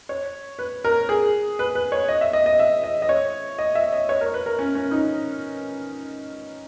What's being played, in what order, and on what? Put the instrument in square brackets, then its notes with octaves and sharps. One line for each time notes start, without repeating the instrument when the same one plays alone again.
[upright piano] C#5
B4
A#4
G#4
B4
B4
C#5
D#5
E5
D#5
D#5
E5
D#5
D#5
C#5
D#5
E5
D#5
C#5
A#4
B4
A#4
C#4
C#4
D#4